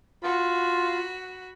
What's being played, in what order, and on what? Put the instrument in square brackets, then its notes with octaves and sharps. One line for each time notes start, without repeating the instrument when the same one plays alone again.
[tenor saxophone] F4 [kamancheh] F#4 B5